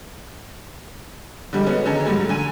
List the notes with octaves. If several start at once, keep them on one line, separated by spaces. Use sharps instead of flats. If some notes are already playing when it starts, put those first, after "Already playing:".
D3 G3 G#3
G#3 B3 C#4 F#4
D3 D#3 C#4 G#4 A#4
G#2 F#3 G3 A3
D3 G#5 D#7